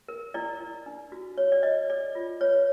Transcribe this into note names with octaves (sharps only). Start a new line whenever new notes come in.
A#4
E4 D5
E4
D4
F#4
C#5
D5
C#5 D#5
A4 D5
F4
B4 C#5